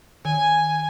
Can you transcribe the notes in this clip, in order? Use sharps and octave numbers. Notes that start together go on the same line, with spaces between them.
D#3 G#5